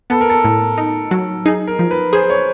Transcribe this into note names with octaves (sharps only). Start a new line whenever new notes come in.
B3 A4
A#4
A4
A2
D#4
F#3
D#4 G#4
A#4
F3
B4
G#4 C5
C#5